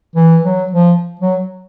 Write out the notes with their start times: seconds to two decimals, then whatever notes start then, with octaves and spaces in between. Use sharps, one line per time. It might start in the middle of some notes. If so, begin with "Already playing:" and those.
0.16 E3
0.44 F#3
0.72 F3
1.21 F#3